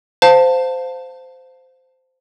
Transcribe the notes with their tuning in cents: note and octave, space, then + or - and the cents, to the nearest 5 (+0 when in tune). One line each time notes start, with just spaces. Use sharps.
C5 -15 F5 +20 A5 +15